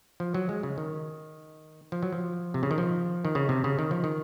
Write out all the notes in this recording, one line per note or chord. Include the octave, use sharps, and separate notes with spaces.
F3
F#3
G#3
C#3
D#3
F3
F#3
F3
C3
C#3
D#3
F3
D#3
C#3
C3
C#3
D#3
F3
D#3